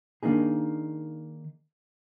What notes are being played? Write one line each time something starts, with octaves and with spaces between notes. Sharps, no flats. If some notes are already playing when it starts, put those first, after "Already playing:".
D#3 A#3 D4 D#4 G#4